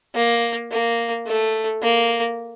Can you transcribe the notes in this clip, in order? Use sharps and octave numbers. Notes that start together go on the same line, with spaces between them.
A#3
A#3
A3
A#3